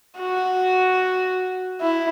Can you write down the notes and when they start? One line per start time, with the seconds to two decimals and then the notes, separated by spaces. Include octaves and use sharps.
0.18 F#4
1.81 E4